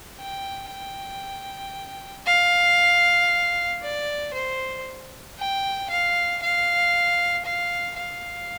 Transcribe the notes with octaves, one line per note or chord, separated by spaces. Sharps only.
G5
G5
F5
D5
C5
G5
F5
F5
F5
F5